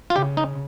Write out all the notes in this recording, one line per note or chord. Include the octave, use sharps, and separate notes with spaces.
F4
C#3 G4
D#4